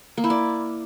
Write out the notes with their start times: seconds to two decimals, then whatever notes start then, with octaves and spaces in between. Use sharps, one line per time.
0.17 A#3
0.24 E4
0.30 D5